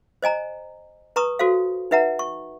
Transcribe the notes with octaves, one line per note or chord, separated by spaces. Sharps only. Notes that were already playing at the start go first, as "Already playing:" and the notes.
C5 D#5 G#5 A#5
B4 A#5 C#6 D#6
F#4 A4 C5 F5
D#4 B4 E5 F#5 A#5
C#6